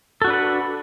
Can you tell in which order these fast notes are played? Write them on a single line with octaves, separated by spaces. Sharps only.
A4 F#4 D4 B4 F#5